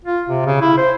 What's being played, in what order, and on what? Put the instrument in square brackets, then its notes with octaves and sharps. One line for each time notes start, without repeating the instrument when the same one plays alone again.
[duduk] F4
C3
C#3
E4
C5